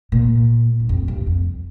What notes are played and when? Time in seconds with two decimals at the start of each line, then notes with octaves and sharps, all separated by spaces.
0.12 A#2
0.80 G2
0.89 F2
1.08 G2
1.27 F2